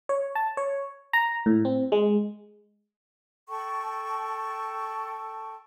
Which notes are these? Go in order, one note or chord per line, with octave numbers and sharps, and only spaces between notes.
C#5
A5
C#5
A#5
A2
C4
G#3
A4 G5 A5 C#6